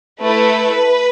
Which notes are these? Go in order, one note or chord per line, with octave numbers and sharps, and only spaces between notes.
A3 E4 A4 B4